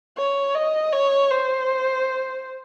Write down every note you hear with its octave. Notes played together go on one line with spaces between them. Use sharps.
C#5
D#5
C#5
C5